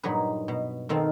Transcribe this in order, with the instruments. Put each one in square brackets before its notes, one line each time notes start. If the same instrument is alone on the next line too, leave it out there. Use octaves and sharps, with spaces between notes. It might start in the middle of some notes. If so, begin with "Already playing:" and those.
[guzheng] G2 A#2 F#3 D#4 G#4 B4
B2
B2 D#3 C4 A4 F5